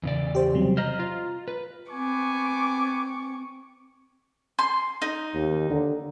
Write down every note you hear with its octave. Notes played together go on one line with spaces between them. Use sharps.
E2 C#3 D5
G4 C5
C3 F#3 G3
C5 D#5 A#5 F6
F4
B4
B3 C4 G#5 C#6 D6
C6
D#4
D#2
D3